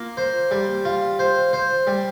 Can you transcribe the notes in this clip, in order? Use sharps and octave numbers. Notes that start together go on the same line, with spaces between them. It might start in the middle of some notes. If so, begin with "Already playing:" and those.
Already playing: A#3 F4
C5
G3
F4
C5
C5
G3